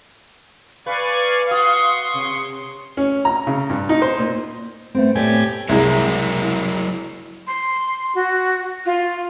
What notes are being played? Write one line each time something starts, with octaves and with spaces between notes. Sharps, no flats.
B4 D5 F5 G#5 C#6
F#4 C6 C#6 D#6
C3
C#4
A#5
C#3
G2
D#4
C5
A#2
A3 B3 C4
A2 G4 C#5 D5 G#5
C2 F#3 G#3 E4 A#4
C6
F#4
F4